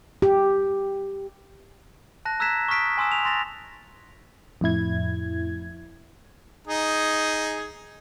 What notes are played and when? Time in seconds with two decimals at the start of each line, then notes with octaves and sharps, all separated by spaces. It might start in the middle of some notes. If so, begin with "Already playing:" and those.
0.22 G4
2.25 A5 F#6 A#6
2.40 A#5 E6 F#6 G#6 B6 E7
2.68 C#6 D#6 F6 B6 D7
2.98 G#5 C6 D#6 E6 E7
3.12 F7
3.25 C6 A6 A#6 F7
4.61 F2 A2 E4 G#6
6.67 D#4 G#4